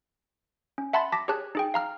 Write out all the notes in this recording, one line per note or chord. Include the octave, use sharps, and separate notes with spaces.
C#4
E5 F#5 A5 B5 C6 A6
A5 D6 A#6 B6
G4 G#4 C#5 A5 F#6
D#4 G#4 G5
F5 A#5 F6